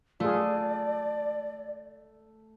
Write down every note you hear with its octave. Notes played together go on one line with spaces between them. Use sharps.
A3 F4 G#4 D5